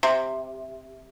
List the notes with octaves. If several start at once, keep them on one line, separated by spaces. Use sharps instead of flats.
C3